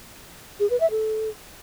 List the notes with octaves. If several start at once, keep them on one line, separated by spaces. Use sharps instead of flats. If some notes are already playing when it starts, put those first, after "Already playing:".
G#4
B4
E5
A4